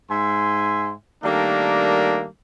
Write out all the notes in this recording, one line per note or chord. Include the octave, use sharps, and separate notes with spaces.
G#2 E5 G#5 C6
D#3 G3 A3 A#3 D4 A#4